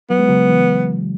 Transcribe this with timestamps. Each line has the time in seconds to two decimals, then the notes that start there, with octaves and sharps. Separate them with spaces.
0.10 F#3 B3
0.19 G#3
0.29 C#3 F#3
0.49 E3